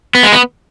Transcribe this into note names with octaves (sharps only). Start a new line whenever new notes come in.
B3
G#3
B3